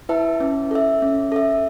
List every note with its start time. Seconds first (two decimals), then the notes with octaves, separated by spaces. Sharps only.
0.09 E4 B4 E5 A5
0.40 C#4
0.71 A4 E5
1.02 C#4
1.32 A4 E5